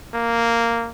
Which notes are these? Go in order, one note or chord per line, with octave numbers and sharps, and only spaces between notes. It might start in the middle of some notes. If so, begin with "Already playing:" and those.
A#3